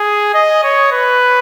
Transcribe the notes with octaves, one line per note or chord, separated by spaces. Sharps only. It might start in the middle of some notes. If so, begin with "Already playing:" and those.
Already playing: G#4
D#5
C#5
B4